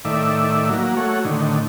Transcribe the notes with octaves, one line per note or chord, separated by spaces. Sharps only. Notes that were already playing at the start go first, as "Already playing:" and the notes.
A2 D#3 D5 E5
F#3 A#3
A3 F#4 C#5
A2 D3 D#3